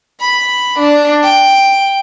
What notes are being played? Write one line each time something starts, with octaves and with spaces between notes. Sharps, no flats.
B5
D4
G5